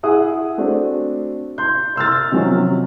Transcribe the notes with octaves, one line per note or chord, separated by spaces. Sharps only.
E4 G#4 F#5 D#6
A3 C4 D4 F#4
C6 G6
C6 E6 F6 A6
C3 D#3 F3 F#3 C#4